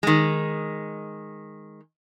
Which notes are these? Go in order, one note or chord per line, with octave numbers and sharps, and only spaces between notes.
D#3 G#3